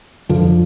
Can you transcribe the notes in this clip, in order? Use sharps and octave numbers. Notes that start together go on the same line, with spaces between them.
F2 D3 F3